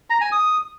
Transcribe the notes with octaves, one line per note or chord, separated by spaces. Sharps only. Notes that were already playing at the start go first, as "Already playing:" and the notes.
A#5
G#5
D#6